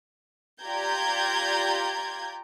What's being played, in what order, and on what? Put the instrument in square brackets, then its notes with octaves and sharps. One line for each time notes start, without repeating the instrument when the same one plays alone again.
[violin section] F4 G4 D5 A#5 G6 G#6